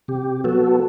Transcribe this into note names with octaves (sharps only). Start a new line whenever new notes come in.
C3 G4
F#3 B3 F#4 A4